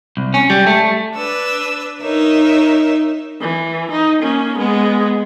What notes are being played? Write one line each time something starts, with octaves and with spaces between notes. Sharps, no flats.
C2
C#4
G3
A3
D4 B4 E6
D#4 A#4 C#5 E5
E3
D#4
A#3 C#4
G#3 B3